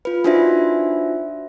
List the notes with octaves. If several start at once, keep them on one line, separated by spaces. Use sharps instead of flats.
F4 B4
D4 D#4 F4 F#4 C5 E5